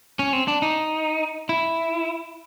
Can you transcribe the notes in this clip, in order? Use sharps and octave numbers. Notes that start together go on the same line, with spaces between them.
C#4
C4
D4
D#4
E4